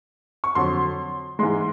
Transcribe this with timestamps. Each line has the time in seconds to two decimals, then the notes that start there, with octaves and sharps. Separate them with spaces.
0.44 C#6
0.55 F2 D3 F#3 C6
1.39 G#2 E3 G#3 C6